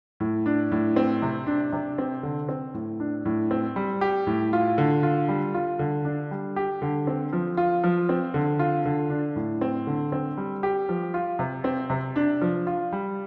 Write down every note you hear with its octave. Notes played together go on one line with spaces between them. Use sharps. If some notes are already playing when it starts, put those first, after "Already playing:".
A2
D4
A2
C4
C3
D4
C3
C4
D3
C4
A2
D4
A2
C4
G3
G4
A2
F4
D3
F4
G3
F4
D3
D4
G3
G4
D3
C4
F3
F4
F3
C4
D3
F4
D3
D4
A2
C4
D3
C4
G3
G4
F3
F4
C3
C4
C3
D4
F3
F4
G3